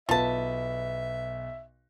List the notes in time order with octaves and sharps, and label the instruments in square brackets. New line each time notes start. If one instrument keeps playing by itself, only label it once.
[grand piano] B1 B4 [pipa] F4 A5 [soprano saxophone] E5